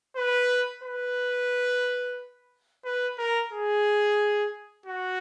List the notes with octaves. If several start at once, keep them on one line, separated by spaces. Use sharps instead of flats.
B4
B4
B4
A#4
G#4
F#4